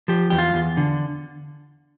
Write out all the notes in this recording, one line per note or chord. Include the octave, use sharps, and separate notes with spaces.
F3 G4
E2 G4
F4
E2
D3